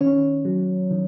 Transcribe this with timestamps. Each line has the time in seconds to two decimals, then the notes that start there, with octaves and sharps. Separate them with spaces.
0.01 D#3 C#4 C#5
0.45 F#3
0.91 D#3